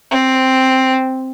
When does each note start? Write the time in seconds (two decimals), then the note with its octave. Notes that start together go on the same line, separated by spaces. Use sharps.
0.11 C4